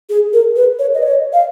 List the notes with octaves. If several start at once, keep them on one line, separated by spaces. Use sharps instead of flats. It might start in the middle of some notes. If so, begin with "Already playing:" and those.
G#4
A#4
B4
C#5
D#5
C#5
F5